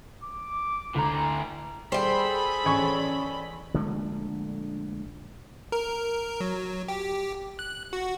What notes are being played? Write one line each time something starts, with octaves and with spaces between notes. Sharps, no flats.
D6
D2 A2 A#5
G3 G#4 A4 C5 G5 B5
A1 C#4 D5 G#5 C#6
A#1 D3 G#3 A3
A#4
F#3
G4
F#6
F#4